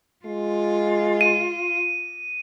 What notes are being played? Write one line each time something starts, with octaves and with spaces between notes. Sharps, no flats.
G#3 F4
D#7